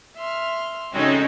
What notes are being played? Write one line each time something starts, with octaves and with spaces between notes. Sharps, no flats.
E5 C6 F6
C#3 G#3 A3 C4 C#4 D#4 F#4